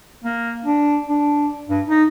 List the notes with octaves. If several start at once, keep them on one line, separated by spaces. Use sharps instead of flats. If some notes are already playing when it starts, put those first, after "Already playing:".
A#3
D4
D4
G2
D#4